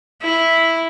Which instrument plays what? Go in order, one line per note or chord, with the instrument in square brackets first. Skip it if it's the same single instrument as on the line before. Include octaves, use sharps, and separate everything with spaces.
[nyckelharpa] E4